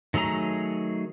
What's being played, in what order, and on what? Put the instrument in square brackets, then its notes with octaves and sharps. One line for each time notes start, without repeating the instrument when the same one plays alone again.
[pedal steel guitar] D#3 F#3 A3 G#4 A#5